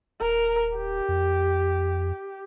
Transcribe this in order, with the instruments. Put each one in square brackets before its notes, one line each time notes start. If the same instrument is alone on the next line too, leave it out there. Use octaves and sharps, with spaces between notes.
[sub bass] D#1 [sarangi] A#4
[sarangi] G4
[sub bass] F2